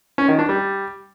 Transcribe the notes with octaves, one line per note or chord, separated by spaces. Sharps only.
C#4
D#3
D4
G3